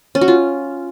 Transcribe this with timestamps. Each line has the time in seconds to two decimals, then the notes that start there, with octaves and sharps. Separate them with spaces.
0.15 C#4
0.21 F#4
0.28 F4